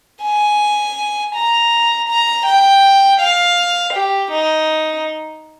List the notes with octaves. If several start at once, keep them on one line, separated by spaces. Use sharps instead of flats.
G#5
A#5
A#5
G5
F5
G4
D#4